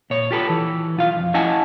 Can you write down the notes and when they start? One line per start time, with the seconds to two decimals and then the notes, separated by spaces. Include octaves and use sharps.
0.10 A#2 C#5
0.31 F4 G4 A4 B4
0.49 E3
0.97 B1 F4 F5
1.16 F2
1.34 C#4 E4 D#5 F#5 G#5 A5